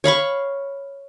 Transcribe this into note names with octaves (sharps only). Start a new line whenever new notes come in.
C#5 F5 B5 C#6